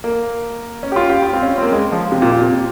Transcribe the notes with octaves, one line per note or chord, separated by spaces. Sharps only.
A#3
C#4
G4
F4
G4
F4
C4
C#4
C4
A#3
G#3
F3
C3
A#2
A#2
C3